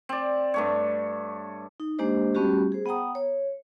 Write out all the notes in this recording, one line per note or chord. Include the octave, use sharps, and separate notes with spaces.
C4 D5
G2 A3 C#5
D#4
G#3 A#3 D4 G4 C5 D#5
G3 A3 B3 C#4 F#4 G4
G#4 C5
B3 F#5 G5 A#5 D#6
C#5